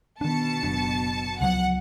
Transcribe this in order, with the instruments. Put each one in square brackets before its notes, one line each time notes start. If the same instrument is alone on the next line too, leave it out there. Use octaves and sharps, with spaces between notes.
[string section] B2 A5 C#7 [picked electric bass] D#3 D4
[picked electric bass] F#1 F#2 D4
[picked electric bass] C#2 F3 F#3 [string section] F#5